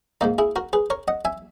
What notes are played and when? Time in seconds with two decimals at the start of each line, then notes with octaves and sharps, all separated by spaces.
0.21 G#2 D#3 A#3 D#4
0.38 E4 G#4
0.56 F#4 A#4
0.73 G#4 B4
0.90 A#4 C#5
1.08 D#5 F#5
1.25 E5 G#5